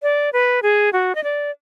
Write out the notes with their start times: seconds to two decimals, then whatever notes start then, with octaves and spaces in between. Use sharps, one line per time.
0.03 D5
0.33 B4
0.63 G#4
0.93 F#4
1.15 D#5
1.24 D5